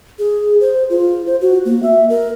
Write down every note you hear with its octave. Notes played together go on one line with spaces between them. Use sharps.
G#4
C5
F4
C5
F#4
A#3
E5
A#4